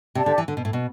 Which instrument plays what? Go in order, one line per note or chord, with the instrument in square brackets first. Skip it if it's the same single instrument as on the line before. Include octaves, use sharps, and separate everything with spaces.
[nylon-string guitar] C3 [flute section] G4 D5 A5
[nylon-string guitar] D3
E3
D3
B2
A2
B2